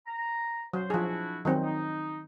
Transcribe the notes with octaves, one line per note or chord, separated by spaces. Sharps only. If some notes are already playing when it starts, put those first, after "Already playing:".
A#5
F#3 C5
F3 D4 E4 F#4 G#4
D#3 F#3 C4
D#4